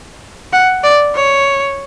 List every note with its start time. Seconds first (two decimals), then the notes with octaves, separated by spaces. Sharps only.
0.53 F#5
0.84 D5
1.15 C#5